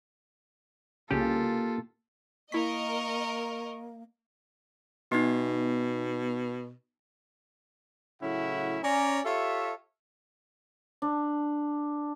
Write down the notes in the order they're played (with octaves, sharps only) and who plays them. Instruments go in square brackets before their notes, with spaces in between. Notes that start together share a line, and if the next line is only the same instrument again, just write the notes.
[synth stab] C2 C#3 C#4 [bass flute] A#3 [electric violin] F4 A4 [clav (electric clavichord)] G4
[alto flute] A#3 [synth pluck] E4 B6 [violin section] A#4 D#5 [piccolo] C#6
[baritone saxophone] B2 [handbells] B3 D#4
[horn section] A2 C#3 F#3 C#4 E4 F#5
C#4 D5 A#5
F4 G4 A4 C#5 E5
[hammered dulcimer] D4